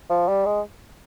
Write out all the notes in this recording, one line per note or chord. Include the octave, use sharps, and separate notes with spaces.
F3
G3
G#3